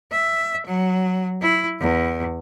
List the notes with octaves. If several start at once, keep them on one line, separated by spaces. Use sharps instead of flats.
E5
F#3
E4
E2